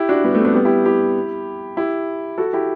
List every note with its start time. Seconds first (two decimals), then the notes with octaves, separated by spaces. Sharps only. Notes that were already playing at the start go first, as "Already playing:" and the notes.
Already playing: E4 G4
0.09 D4 F#4
0.24 G3 B3
0.35 A3 C4
0.45 B3 D4
0.55 G3 B3
0.65 E4 G4
0.85 E4 G4
1.77 E4 G4
2.38 F#4 A4
2.53 E4 G4